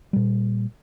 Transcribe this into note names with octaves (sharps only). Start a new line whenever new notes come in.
A#2 G3